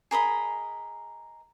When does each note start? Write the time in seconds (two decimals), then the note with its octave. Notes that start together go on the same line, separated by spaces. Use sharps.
0.11 G#4 A#4 D#5 B5